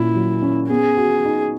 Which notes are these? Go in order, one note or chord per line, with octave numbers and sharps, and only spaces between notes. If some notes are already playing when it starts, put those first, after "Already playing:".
Already playing: A#2 A#3 C#4 E4
F#3
C#4
B3 G#4
F#4
D#4